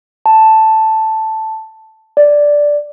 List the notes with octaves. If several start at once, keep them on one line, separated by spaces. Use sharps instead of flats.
A5
D5